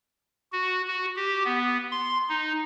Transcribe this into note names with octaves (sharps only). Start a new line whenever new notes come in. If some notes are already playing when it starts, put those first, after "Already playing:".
F#4
F#4
G4
B3
C6
D#4